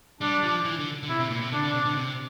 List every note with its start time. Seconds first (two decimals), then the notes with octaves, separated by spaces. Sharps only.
0.20 G3 D4
0.43 F3
0.65 E3
0.79 D3
1.03 D3
1.08 C3 E4
1.19 C3
1.30 A#2
1.41 C3
1.52 D3 D4
1.63 D3
1.73 C3
1.85 D3
1.96 C3